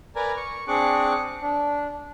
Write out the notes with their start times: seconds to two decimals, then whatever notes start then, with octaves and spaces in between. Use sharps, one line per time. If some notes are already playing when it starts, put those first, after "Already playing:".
0.16 A#4 B4 D5 G#5 A#5
0.37 C#6
0.67 C4 D4 G#4 C#6 D6 F#6
1.42 D4